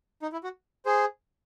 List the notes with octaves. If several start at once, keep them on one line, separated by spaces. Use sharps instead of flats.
D#4
E4
F#4
G#4 C5